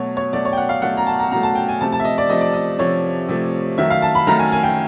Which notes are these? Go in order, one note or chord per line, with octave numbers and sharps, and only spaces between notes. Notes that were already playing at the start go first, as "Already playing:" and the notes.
Already playing: B2 F#3 A3 C#5
C#5
B2 F#3 A3 D5
C#5
G5
F#5
F5
B2 F#3 A3 F#5
A#5
A5
A#5
B2 F#3 A3 A#5
A5
G5
G#5
C3 F3 A3 A5
A5
E5
D#5
D5
C3 F3 A3 D#5
D5
D#5
C3 F3 A3 C#5
C3 F3 A3
D#3 F#3 A3 E5
F5
A5
B5
D#3 F#3 A3 A#5
G#5
G#5
G5